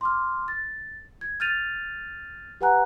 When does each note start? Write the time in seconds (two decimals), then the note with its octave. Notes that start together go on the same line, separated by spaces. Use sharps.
0.01 C6 D6 F6
0.48 A6
1.21 G#6
1.40 F6 G6 A6 D#7 F7
2.61 G4 B4 F#5 G#5 A#5 F#6